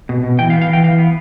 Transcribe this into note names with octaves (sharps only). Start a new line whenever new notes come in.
B2
B2
E3 G5
F5
B3
F5
E3 G5
E3 F5
B3